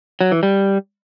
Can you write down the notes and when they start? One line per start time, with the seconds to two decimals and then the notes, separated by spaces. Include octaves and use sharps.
0.21 F#3
0.32 E3
0.43 G3